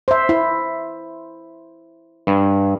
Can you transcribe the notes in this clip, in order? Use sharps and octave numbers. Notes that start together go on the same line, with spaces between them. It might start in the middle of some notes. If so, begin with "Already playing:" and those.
C5 E5
E4
G2